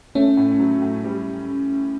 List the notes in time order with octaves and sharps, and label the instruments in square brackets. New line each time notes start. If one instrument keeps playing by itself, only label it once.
[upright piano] A3 [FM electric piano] C#4
[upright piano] A2
F#3
A2
G3